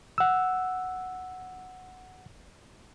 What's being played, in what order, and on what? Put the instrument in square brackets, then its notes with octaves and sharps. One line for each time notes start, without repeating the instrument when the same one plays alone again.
[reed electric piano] F#5 E6